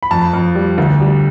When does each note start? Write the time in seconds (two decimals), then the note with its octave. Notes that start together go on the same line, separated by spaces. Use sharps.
0.03 B5
0.11 F2 A5
0.33 F2
0.55 G3
0.78 D2
1.00 G3